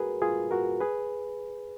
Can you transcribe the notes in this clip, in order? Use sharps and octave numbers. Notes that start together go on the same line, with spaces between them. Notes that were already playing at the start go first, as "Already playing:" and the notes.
Already playing: F#4 G#4 A#4 B4
F4 G#4
F#4 A#4
G#4 B4